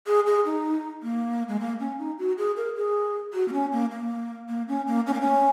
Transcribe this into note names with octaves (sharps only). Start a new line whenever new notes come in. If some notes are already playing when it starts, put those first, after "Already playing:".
G#4
G#4
D#4
A#3
G#3
A#3
C#4
D#4
F#4
G#4
A#4
G#4
F#4
A#3
C#4
A#3
A#3
A#3
C#4
A#3
C#4
A#3
C#4